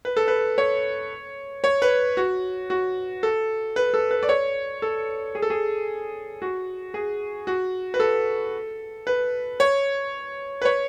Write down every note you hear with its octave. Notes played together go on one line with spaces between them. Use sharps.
B4
A4
B4
C#5
C#5
B4
F#4
F#4
A4
B4
A4
B4
D5
C#5
A4
G#4
A4
G#4
F#4
G#4
F#4
B4
A4
B4
C#5
B4
C#5